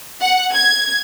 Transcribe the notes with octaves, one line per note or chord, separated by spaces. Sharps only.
F#5
G#6